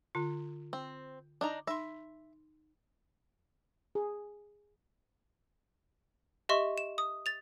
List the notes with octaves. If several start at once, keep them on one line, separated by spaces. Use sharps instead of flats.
D3 F4
C4
D4 D#4 A#5
D#4 E5 C6
G#4
G4 D#5 E5 C6 C#6
E7
D#6
A6 F7